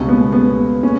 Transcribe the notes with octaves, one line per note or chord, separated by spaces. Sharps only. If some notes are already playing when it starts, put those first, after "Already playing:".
Already playing: C#2 B2 G3 C#4
B3
B3
C#4